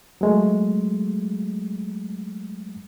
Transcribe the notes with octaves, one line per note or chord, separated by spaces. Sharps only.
F#3 G#3 A3